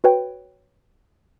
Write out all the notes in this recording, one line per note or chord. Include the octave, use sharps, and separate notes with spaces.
F#4 B4 C#5 G5